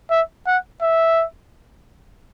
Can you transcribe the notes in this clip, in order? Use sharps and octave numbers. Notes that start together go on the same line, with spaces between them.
E5
F#5
E5